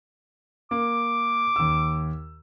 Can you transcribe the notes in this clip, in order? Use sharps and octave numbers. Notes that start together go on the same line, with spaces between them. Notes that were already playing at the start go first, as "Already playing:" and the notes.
A#3 D6
D#2 E6